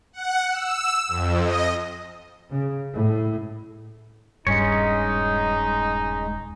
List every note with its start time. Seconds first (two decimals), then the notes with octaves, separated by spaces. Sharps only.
0.13 F#5
0.51 E6
1.08 F2
1.42 D#5
2.50 C#3
2.92 A2
4.47 D#1 G2 G#3 C#4 D#4 C#5